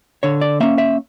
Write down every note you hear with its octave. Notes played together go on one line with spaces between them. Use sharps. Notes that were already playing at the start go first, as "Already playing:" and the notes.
D3 C#5
D5
A#3 C#4 E5
E5